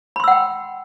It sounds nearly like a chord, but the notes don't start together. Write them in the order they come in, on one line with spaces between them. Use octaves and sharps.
B5 C6 E6 F#5 G5